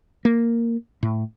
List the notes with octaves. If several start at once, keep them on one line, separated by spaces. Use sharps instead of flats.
A#3
A2